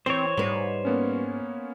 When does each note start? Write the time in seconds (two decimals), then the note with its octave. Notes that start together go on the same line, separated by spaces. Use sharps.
0.06 E3 C4 C5 C#5
0.37 G#2 G3 B4
0.85 A#3 B3 C#4